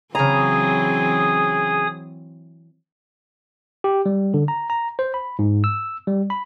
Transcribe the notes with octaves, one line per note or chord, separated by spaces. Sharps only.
C#3 E3 F#3 C4 G#4 A#5 D#6
G4
G3
D3
A#5
A#5
C5
B5
G#2
E6
G3
B5